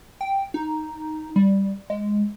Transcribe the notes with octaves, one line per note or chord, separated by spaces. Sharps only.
G5
D#4
G3
G#3